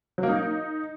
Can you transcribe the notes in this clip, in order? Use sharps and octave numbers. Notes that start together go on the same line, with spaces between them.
F#3
A#3
D#4